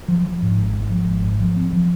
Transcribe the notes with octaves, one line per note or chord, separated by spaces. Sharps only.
F3
F3
G#2
G#1
G#2
F3
G#1
G#2
F3
C4
F3